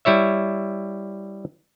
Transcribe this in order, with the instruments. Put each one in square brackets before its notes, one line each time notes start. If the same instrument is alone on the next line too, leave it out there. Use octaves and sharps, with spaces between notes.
[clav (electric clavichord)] G3 E4 C#5 E5